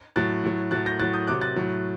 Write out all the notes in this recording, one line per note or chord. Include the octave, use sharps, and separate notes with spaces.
A2 F#3 F#6 A6
A2 F#3
A2 F#3 F#6 A6
G6 A#6
A2 F#3 F#6 A6
D#6 G6
C3 F#3 D6 F#6
F#6 A6
A2 F#3